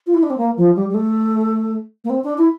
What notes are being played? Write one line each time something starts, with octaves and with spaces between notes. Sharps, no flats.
F4
E4
D4
C4
A#3
F3
G3
G3
A3
A#3
C4
D4
E4